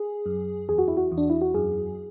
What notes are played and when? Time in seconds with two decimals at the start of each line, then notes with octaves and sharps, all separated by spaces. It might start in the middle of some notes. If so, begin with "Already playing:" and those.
Already playing: G#4
0.26 F#2
0.69 E2 G#4
0.78 F#4
0.88 E4
0.97 F#4
1.12 E2
1.18 D4
1.30 E4
1.41 F#4
1.54 F#2 G#4